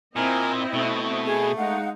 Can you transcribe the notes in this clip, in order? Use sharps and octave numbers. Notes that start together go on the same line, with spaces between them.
A#2 C4 E4 A#4 D#5 G#5
B2 A3
G#4
G#3 D#4 F5 F#5